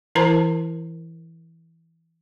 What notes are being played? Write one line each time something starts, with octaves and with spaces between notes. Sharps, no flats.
E3 E4 A#4 C5 A5 A#5